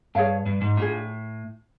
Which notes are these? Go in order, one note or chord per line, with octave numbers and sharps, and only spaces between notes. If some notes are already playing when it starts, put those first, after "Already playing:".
G2 G#4 C#5 F5 A5
G2
G#2
A2 D4 F4 G#4